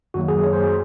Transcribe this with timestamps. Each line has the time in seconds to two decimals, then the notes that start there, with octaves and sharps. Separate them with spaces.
0.14 F#2 D#3 F#3 A#3 F#4
0.28 G#4
0.44 C#5
0.53 C5
0.64 G#4